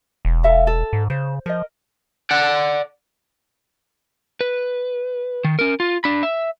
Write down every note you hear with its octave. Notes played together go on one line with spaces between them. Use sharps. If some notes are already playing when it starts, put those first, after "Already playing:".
E1
A4 E5 F5
A4
G#2
C#3 C5
F3 A#4 D#5
D5 F#5
B4
D#3
C#4 A#4
F4
D4 B5
E5